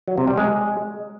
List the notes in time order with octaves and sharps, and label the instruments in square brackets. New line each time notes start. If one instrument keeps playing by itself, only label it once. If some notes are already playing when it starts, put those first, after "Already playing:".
[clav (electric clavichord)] F#3
C3
G3
G#3